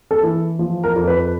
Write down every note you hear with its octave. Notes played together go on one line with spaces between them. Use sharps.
A4
E3
F3
A#4
F2
B4